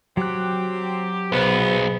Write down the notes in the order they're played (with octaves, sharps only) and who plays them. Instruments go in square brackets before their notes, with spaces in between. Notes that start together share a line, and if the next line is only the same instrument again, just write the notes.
[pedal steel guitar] F#3 F#6 [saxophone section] C4 G4
[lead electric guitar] B1 [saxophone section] B3 [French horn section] G#4 C5